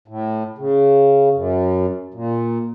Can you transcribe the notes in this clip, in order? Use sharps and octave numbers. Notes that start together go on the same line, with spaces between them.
A2
C#3
F#2
A#2